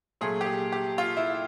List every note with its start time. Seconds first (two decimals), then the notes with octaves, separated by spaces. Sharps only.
0.21 A#2 F#3 A3 G#4
0.41 G4
0.46 G#4
0.72 G4
0.98 F4
1.17 E4